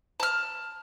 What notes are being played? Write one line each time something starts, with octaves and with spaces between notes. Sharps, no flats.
A5 F6